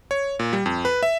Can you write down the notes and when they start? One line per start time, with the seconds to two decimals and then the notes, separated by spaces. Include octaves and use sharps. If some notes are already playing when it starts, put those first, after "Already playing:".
0.11 C#5
0.39 A#2
0.53 G3
0.66 F2
0.85 B4
1.03 E5